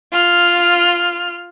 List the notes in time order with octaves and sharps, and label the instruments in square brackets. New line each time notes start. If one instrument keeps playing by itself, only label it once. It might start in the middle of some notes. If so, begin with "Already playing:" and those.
[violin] F4 F6